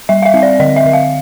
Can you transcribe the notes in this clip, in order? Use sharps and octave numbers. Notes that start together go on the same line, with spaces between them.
G3 E5
F5
E5
C4
D5
D3 D#5
E5
D3
F5